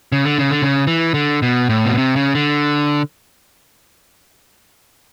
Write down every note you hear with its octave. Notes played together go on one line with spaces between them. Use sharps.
C#3
D3
C#3
D3
C#3
E3
D3
B2
A2
B2
C3
C#3
D3